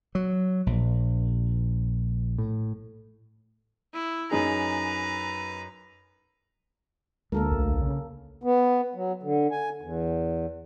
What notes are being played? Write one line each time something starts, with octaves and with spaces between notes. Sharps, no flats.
F#3
A#1
A2
E4
F#2 D#4 G#4 B4 A#5
D2 G#3 A#3 A4 A#4
B1 F2
C#3
B3
F#3
D3
G#5
E2